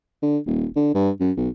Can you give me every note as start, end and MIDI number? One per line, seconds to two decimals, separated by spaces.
0.22 0.38 50
0.46 0.66 27
0.76 0.90 50
0.94 1.10 43
1.20 1.32 42
1.37 1.48 35